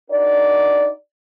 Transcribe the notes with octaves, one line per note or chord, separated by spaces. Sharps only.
D4 D#4 F#4 A#4 D5